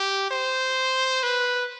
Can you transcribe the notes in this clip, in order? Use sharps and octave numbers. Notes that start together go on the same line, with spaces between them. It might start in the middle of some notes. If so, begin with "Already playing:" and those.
Already playing: G4
C5
B4